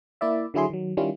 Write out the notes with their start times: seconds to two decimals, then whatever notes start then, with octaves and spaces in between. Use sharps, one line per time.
0.21 A#3 E4 D5 E5
0.54 D3 F#3 E4 G#4 C6
0.70 D#3 F#3
0.97 D#3 G3 C#4 E4 F4